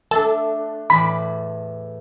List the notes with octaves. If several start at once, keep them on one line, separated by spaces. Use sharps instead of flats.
A3 D4 A4
E2 A2 D5 B5